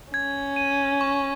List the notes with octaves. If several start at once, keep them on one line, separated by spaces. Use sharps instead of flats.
C#4 G#6
D#7
C#6